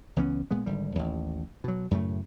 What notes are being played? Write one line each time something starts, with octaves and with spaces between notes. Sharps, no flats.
C#2 E3 B3 C#4
A#2 G#3 B3
G#1 D3 G3
A1 D#2
B2 F#3
F#2 A2 C#3 A3